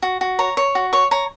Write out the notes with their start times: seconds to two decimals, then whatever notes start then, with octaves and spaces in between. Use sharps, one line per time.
0.02 F#4
0.21 F#4
0.39 C#5 A#5
0.57 C#5
0.75 F#4
0.93 C#5 C#6
1.11 C#5 A#5